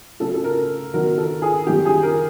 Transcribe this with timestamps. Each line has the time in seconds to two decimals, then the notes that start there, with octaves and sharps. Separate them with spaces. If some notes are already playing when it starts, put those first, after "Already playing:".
0.20 C#3 F#3 A3 C#4 A4
0.34 A4
0.44 A#4
0.93 D#3 F#3 B3 D#4 A#4
1.18 A4
1.42 G#4
1.67 F#2 D#3 G3 G4
1.85 G#4
2.03 A#4